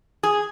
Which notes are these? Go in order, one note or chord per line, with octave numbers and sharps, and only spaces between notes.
G#4